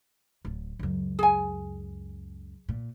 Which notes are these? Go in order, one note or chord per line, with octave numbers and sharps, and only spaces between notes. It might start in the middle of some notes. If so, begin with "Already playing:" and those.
D1
C#2 F#2
G#4 G#5
A#2